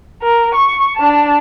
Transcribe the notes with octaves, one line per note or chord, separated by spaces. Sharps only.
A#4
C#6
D4 A5